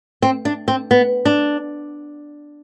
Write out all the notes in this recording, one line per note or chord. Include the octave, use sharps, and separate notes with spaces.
C4
D4
C4
B3
D4